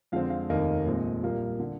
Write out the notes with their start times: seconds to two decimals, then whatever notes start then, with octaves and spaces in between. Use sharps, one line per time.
0.12 F2 D3 G#3 C4 F5
0.30 F5
0.49 F1 D#2 D#3 A#3 D#5
0.86 A#1 A#2 F3 G#3 C4
1.22 A#1 A#2 G3 A#3
1.60 D3